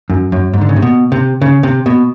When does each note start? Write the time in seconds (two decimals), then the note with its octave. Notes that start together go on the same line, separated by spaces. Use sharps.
0.10 F#2
0.32 F#2
0.53 G#2
0.61 D3
0.69 C#3
0.76 C3
0.82 B2
1.12 C3
1.41 C#3
1.63 C3
1.86 B2